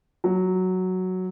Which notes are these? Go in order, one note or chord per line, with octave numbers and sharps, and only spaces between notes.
F#3